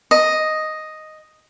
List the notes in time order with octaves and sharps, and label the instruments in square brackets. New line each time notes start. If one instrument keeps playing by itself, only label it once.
[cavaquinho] D#5